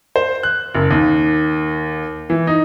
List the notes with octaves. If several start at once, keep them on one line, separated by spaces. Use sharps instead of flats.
C5
F#6
F#1
D#2
E3
D#4